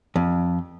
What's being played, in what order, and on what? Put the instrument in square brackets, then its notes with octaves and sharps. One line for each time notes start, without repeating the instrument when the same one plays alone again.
[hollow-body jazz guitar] F2